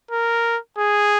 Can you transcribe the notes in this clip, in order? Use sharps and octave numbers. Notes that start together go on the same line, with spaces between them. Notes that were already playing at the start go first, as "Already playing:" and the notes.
A#4
G#4